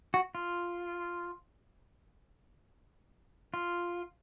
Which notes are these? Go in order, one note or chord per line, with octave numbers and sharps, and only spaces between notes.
F#4
F4
F4